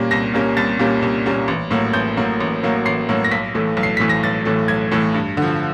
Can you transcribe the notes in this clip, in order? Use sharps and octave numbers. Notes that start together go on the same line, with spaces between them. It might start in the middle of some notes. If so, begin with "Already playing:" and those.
Already playing: A#2 G3 A#3 C#4
C2 A#6
A#2 G3 A#3 C#4
C2 A6
A#2 G3 A#3 C#4
C2
A#2 G3 A#3 C#4
A1
A2 F#3 A#3
A1 G6
A2 F#3 A#3
A1
A2 F#3 A#3
A1 C7
A2 F#3 A#3
A#6
B1 B6
A2 E3 A3
B1
C7
A2 E3 A3 B6
A#6
B1 A6
A2 E3 A3
B1 G#6
A2 E3 A3
G2
D3 F3